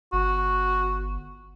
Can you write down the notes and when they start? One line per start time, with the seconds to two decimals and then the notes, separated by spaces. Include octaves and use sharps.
0.13 G1 F#4